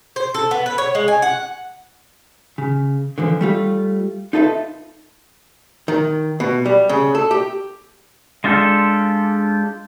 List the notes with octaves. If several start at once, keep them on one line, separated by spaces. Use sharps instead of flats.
C5
A4
B3
B4
C#5
G#3
G#5
F#5
C#3
D3 E3 F3
G3 A3 F4
D#4 F4 A4 B4 D#5 E5
D#3
B2
G3
C#3
A4
G4
G#3 D4 F4 G4 A4